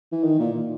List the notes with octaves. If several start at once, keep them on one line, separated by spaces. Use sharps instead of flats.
E3
D#3
A#2